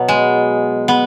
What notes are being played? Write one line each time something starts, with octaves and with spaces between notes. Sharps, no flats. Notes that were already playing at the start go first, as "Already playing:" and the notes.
Already playing: B2 F#3 B3
G#3
B3